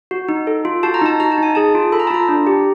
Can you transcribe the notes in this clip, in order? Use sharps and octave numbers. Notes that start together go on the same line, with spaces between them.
F#4
D#4
A4
F4
F#4 A5
A#5
D#4 A5
F#4 A#5
A5
D#4
G#5
G#4 A5
F4
A4 B5
A#5
A5
F4 A#5
D4
G4